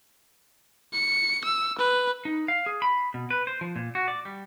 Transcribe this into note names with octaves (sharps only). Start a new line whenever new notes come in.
C#7
E6
B4
D#4
F5
G#4
B5
B2
B4
C5
F3
A#2
F#4
D5
G3